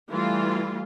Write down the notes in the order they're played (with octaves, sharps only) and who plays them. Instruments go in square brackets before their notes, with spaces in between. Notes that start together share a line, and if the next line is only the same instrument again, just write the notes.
[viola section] E3 F4 [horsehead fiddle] G3 A3